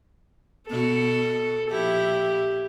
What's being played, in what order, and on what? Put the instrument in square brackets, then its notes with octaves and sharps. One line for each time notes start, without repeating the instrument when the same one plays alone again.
[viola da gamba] B2 F#4 [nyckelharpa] A4
[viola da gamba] A#2 F3 E4 [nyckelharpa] G4